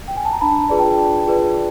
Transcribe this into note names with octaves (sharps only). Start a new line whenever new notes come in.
G5
G#5
A5
A#5
D4 A5 B5
F4 G#4 B4 D5
G5 A5
D4
F4 G#4 B4 D5